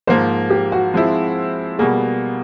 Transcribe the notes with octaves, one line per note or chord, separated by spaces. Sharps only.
G#2 F3 A#3 C5
G4
F#4
F3 G#3 C4 E4
B2 G3 A#3 G#4